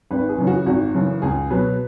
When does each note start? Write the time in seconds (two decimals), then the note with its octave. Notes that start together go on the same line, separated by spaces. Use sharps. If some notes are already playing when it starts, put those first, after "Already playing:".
0.11 G#1 B4
0.29 G#4
0.38 F#2 C#3 E3
0.47 F#4
0.66 G#1 F#4
0.95 F#2 C#3 E3
1.22 C#2 G#4
1.51 B2 F#3 B4